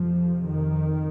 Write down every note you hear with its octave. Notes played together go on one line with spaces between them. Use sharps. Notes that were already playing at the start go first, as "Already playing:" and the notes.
Already playing: F2 C3 F3
D#3